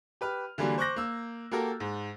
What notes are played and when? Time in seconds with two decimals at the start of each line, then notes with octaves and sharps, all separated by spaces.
0.21 G4 B4 F6
0.58 D3 E3 F#3 G3 A#3
0.78 C5 C#6 D6 F#6 G6 A#6
0.96 A#3 E6
1.51 A#3 F#4 G4 A4 A#4
1.80 G#2